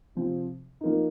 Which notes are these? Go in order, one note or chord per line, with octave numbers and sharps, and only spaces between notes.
C3 F3 C4
F3 A#3 D#4